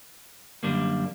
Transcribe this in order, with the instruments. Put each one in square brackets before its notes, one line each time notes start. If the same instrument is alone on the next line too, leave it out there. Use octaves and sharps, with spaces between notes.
[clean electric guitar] F#2 D3 G3 A#3 D4